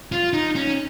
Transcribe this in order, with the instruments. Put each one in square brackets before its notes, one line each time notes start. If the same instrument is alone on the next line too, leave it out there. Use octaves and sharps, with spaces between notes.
[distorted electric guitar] F4
D#4
C#4